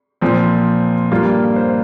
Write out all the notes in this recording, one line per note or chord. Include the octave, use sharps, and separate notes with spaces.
A#2 F3 C4
G2 G3 A#3 F4
C5